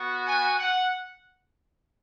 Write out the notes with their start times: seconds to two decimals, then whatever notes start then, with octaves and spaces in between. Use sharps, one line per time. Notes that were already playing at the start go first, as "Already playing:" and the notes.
Already playing: B3 F#4
0.27 G#5
0.59 F#5